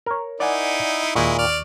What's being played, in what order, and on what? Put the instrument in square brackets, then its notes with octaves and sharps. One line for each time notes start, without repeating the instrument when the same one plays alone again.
[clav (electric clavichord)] A#4 C#5
[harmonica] D#4 E4 [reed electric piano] D5 F#5 G#5
[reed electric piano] D#2 C#6 [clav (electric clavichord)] A#2 [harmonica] G#3 E4
[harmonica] D5 F6